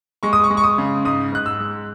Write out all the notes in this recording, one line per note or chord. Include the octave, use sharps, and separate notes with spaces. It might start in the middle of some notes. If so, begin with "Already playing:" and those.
G#3 C#6
D#6
C#6
G#3
C#6
D#6
C#3
G#2 D#6
G#2 F#6
E6
G#3